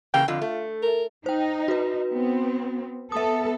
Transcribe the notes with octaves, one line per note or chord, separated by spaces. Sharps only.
C#3 E3 A#3 G5
F2 D3 F4
A3
A#4
D#4 C5 G5
F#4 B4
B3 C4
B3 A4 E5 D#6